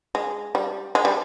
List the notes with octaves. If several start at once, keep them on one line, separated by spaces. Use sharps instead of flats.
G#3
G3
G#3
G3